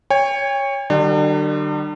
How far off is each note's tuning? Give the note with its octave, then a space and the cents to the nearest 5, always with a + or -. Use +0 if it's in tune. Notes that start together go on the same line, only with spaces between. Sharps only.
C#5 +0 G5 +45
D3 +45 G3 -30 D4 +40